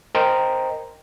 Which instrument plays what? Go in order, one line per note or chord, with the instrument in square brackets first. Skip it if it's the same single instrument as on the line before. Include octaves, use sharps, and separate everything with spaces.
[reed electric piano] A#4 C5 D#5 G5 A#5